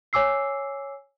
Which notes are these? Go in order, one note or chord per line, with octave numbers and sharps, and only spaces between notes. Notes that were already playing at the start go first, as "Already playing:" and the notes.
C#5 G#5 D6 E6 C7